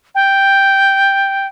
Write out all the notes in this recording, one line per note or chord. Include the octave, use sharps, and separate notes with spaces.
G5